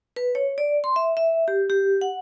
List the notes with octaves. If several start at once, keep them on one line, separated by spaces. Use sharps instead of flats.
B4
C#5
D5
C6
E5
E5
G4
G4
F#5